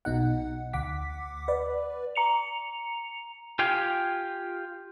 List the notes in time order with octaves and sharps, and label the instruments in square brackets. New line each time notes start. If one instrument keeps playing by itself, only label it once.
[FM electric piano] B1 B2 D#4 F#5
D2 F#5 D6 B6
B4 D5
[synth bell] A#5 C#7 F7
[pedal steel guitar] F4 G4 F5 G5 G#5